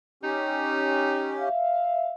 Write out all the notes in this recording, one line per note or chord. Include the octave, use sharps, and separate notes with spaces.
C#4 D#4 G4
E5 F5